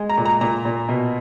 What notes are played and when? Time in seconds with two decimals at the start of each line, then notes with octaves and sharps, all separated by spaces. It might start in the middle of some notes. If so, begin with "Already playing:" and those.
Already playing: G#3
0.10 A#5
0.17 A#2
0.25 A#5
0.41 A#2 A#5
0.65 A#2
0.89 B2